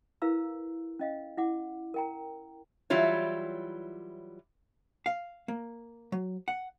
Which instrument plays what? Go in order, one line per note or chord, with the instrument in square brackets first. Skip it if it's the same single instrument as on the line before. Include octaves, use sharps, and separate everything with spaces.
[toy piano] E4 A#4 B4 F5 A#5 E6
C#4 D#5 F5
E4 F#5 D6
A#4 G5 A#5
[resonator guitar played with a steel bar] E3 F#3 G3 E4 F4 C#5
[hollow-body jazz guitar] F5
A#3
F#3
F#5